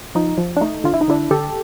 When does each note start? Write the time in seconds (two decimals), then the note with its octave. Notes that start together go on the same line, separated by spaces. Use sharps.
0.15 F3 D#4
0.38 F3
0.56 D4
0.61 A3 D#4
0.84 D3 F4
0.94 E4
1.01 D#4
1.08 D3 D4 E4
1.31 D3 G4 A4